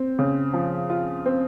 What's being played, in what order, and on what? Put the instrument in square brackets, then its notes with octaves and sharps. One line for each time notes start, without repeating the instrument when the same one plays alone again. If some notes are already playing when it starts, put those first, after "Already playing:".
Already playing: [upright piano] C4
C#3
F3
F4
C4